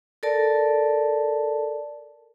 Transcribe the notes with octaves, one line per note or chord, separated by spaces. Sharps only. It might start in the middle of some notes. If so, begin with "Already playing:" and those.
A4 A#4 D5 A5